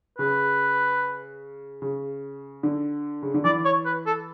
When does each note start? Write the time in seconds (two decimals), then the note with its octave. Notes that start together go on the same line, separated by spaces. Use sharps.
0.19 C#3 B4
1.82 C#3
2.63 D3
3.22 C#3
3.34 D3
3.44 E3 D5
3.65 C#5
3.86 B4
4.06 A4